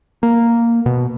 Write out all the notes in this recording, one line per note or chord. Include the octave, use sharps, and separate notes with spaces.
A#3
B2